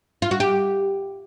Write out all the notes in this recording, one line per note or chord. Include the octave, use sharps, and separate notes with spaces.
F4
F#4
G4